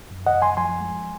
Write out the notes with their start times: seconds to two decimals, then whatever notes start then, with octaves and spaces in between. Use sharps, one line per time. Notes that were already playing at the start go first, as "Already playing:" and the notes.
0.11 F#2
0.27 D#5 F#5
0.34 F#2
0.42 G#5 C6
0.57 F3 G#5 C6
0.81 G#3